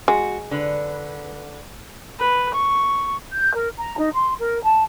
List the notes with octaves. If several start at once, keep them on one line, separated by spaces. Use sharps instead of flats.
G#3 F#4
D3 B4
B4
C#6
G6
A#4
A#5
D#4
C6
A#4
A5